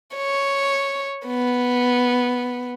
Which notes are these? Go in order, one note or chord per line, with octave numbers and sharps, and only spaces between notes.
C#5
B3